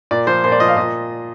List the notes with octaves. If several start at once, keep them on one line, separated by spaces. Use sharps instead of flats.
A#2 D5
F3 C5
A#2 C5
D5
F3 D#5
F5
A#2 D#5